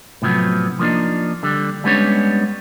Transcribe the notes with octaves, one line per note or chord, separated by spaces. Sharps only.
A2 C3 F3 F#3 B3
F3 A#3 C4 D4 D#4
D3 G3
G3 G#3 B3 C#4 D4 C#5